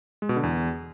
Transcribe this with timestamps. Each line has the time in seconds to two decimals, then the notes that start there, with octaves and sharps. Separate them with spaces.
0.22 G#3
0.29 B2
0.36 D3
0.43 E2